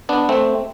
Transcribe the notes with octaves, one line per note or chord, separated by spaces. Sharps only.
B3 D4
A3 C4